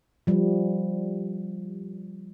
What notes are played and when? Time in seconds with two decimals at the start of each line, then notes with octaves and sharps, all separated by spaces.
0.27 F3 G3